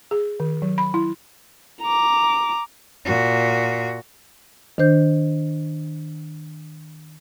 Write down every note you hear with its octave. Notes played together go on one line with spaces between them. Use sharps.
G#4
D#3
F#3
B5
E4
A#5 D6
A#2 F#4
D#3 D4 C5 G6